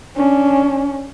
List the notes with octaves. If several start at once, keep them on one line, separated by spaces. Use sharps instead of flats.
C#4 D4